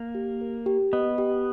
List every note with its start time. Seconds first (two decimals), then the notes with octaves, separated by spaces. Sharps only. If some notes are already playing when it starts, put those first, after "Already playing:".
Already playing: A#3
0.15 G4
0.41 A#4
0.66 G4
0.93 B3 D#5
1.18 G4